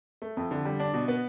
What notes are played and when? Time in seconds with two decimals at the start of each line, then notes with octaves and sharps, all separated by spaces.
0.22 A3
0.37 F2
0.51 D3
0.65 G3
0.79 D4
0.94 B2
1.08 B3